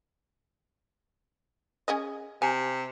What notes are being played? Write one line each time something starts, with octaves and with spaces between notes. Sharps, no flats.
C#4 G#4 D#5
C3 G#5